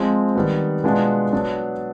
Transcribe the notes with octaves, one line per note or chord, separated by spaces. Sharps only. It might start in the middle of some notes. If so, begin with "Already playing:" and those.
Already playing: F3 G#3 C4
D#3 G3 B3
B2 G#3 B3 D4 F4
F#3 B3 D4